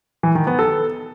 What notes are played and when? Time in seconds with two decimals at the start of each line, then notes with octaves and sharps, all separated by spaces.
0.23 E3
0.35 D#3
0.47 B3
0.59 A4